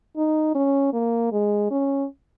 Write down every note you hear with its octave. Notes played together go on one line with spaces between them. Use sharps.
D#4
C#4
A#3
G#3
C#4